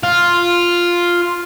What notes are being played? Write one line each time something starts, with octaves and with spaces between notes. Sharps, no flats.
F4